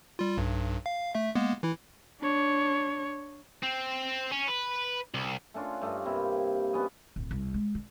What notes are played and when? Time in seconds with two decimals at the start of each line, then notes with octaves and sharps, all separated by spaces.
0.19 G3 F4
0.37 B1 G2
0.86 F5
1.15 A3 E5
1.35 G#3 A#3 B3
1.63 E3 E4
2.21 D4 C#5
3.63 C4
4.32 C#4
4.48 B4
5.14 C2
5.54 A3 C#4 D4 F4
5.82 G2 A3 D#5
6.06 C3 A#3 E4
6.73 B3 C#4 F#4 D#5
7.16 D1
7.31 C2
7.54 G#3
7.75 D3